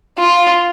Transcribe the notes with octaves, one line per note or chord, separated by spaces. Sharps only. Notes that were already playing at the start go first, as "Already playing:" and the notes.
F4